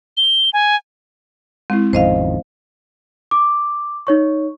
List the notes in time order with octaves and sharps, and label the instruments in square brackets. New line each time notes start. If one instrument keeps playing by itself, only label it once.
[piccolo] G7
G#5
[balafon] G#3 E4 [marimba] C4
[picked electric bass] A1 F2 D#3 [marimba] C5 D#5 F5
[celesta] D6
D#4 C#5 C#6